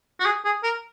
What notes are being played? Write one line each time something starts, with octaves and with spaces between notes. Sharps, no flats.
F#4
G#4
G#4
A#4